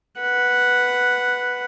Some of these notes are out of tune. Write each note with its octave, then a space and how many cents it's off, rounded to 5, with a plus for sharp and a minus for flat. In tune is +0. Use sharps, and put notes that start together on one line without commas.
B4 +0 F#5 +0